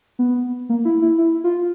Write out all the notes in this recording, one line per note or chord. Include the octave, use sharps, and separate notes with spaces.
B3
A#3
E4
E4
E4
F4